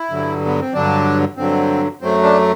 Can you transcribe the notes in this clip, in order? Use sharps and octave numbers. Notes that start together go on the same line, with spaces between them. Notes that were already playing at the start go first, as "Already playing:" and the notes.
Already playing: E4
G2 D3 F#3
B3
C4
G2 D3 F#3 D4
G2 D3 F#3 C4
F#2 F#3 A3 C4
D4